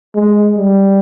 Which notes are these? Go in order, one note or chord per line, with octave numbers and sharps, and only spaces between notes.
G#3
G3